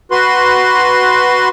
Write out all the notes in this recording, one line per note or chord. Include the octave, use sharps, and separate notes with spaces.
F#4 B4 C6